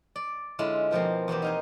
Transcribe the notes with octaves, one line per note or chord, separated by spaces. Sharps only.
D5
D3 G#3 C#4 E4 F4
B2 F3 A#3 C4
E2 E3 F#4 G4
D#4 F5 G#5